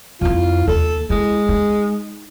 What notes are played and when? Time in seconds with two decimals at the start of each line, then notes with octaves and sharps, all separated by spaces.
0.21 F2 E4 F4
0.68 D#2 A4
1.10 G#3 E4
1.49 D#4